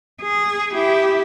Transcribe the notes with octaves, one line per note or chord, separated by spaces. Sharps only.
G#4
E4 G4